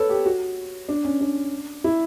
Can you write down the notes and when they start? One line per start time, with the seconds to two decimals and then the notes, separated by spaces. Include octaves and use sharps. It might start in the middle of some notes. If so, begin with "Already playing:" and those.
Already playing: A4 B4 C#5
0.09 G4
0.25 F#4
0.89 D4
1.05 C#4
1.21 D4
1.84 E4